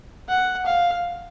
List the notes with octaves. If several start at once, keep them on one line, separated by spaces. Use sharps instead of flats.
F#5
F5